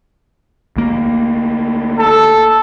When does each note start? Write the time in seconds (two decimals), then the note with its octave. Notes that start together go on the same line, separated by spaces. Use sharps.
0.76 D2 A#3
1.99 A4